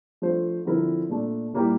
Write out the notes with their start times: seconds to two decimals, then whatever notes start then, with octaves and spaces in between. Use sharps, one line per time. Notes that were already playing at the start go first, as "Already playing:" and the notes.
0.22 F3 A3 D4 F4 C5
0.65 D3 F3 C4 E4 A#4
1.09 A#2 A3 D4
1.53 A#2 G3 A#3 E4 G4